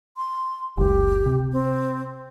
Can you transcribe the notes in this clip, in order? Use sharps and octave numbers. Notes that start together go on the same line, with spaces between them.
C6
F#1 C#2 G4
C3
C4